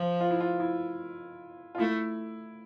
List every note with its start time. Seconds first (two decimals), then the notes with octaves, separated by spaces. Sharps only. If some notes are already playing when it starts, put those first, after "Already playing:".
Already playing: F3
0.21 F4
0.30 E4
0.40 F4
0.60 E4
1.75 F4
1.78 A3 E4